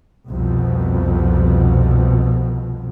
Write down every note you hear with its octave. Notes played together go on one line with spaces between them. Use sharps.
C2 F2 B2